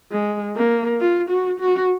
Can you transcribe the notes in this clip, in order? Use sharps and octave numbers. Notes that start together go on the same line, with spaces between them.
G#3
A#3
F4
F#4
F#4